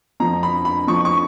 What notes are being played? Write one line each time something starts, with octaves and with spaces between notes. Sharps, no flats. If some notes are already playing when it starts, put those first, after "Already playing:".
F2 F3 A#5
B5
B5
F2 F3 C#6
C#6